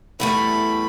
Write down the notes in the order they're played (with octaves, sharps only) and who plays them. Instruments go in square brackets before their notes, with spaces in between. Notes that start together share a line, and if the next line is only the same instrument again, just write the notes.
[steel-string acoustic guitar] E2 G3 A3 [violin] B5